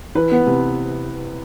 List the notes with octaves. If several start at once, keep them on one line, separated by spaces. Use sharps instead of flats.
E3 B4
B3
C3